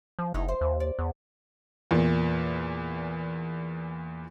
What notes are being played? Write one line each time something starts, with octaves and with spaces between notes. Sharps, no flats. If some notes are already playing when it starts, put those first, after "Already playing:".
F3
F#1 D#4 E4
C5
D#2
D5
E2
E2 A#2